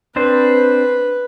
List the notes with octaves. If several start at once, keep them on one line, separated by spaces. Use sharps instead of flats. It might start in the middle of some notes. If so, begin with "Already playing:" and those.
C4 D4 B4 C5